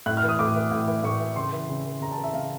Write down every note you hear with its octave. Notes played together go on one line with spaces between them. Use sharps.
A2 F#6
F6
E3
D#6
A2 D6
E3
A2
E3
A2 C#6
E3
C#3 C6
E3
C#3
E3
C#3 A#5
A5
E3
E5
C#3 F5